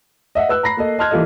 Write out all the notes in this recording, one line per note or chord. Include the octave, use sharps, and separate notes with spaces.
D#5 E5 F#5
B4 E6 F#6
A#5 B5 A#6 C7
A#3 A4 D#5
D#5 A5 C6 F6 F#6 G#6
E3 G3 A#3 F4 A4 D#5